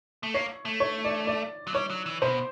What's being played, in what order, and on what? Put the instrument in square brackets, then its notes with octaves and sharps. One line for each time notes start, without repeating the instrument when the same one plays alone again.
[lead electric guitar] A3
[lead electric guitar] A#3 [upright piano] C#5
[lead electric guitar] A3
[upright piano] C#5
D5
D5
[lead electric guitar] F#3
[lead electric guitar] G3 [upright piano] C#5
[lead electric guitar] F#3
E3
[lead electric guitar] B2 [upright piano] C5